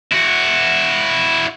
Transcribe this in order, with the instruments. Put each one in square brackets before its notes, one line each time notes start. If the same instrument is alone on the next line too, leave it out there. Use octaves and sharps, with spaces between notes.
[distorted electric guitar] E4 F#4